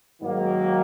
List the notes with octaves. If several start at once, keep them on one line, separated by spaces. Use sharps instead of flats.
G#2 D#3 F#3 A#3